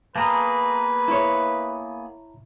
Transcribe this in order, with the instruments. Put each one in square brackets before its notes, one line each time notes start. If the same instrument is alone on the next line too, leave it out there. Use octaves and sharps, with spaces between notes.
[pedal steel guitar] A#3 B3 G#4 [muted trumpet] B4 [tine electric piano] A5 A#5 F6
[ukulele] E4 C#5